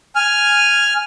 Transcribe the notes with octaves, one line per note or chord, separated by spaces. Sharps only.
G#5 F6